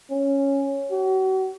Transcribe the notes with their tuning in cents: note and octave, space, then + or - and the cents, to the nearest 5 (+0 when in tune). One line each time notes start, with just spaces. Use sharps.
C#4 -5
F#4 +40